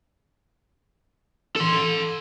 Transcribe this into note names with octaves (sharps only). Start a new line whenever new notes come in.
A4 C6